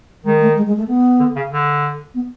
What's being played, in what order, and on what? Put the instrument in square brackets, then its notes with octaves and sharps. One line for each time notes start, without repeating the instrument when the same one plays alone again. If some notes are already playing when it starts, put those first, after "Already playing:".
[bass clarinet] D#3 [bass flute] G#3
[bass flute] A3
G#3
G#3
A3
B3
[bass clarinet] D3
C#3
D3
[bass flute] B3